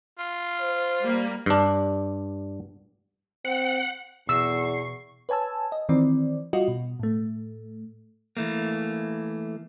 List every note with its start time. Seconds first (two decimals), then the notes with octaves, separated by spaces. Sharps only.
0.19 F4
0.60 C5
1.02 G3 A#3
1.46 G2 D4
3.45 C4 F#5
4.29 E2 B2 C#6 E6 C7
5.29 B4 C#5 G#5 A5 E6
5.72 D#5
5.89 D#3 E3 C4 D5
6.53 G3 F4 F#4 D#5
6.68 B2
6.99 A2 A3
8.37 E3 A3 A#3